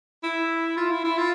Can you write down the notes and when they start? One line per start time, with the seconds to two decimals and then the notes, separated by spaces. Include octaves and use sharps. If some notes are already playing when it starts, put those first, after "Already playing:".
0.23 E4
0.77 F4
0.91 E4
1.04 E4
1.18 F4